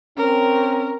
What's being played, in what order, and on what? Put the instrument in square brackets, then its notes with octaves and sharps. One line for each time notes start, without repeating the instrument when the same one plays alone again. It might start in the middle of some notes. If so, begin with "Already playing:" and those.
[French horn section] C4 C#4 [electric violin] A#4